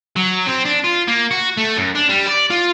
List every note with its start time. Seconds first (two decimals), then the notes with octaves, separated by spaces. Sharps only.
0.16 F#3
0.47 C4
0.66 D4
0.84 F4
1.08 A#3
1.31 F#4
1.57 A3
1.77 F#2
1.95 D4
2.09 G3
2.27 D5
2.50 F4